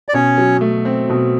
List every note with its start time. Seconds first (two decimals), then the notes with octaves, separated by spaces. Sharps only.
0.09 D5
0.14 B2 C#4 C#5
0.38 F#3
0.61 A3
0.85 C4
1.10 B2